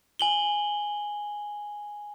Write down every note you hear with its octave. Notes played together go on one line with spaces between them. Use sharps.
G#5 F#7 G7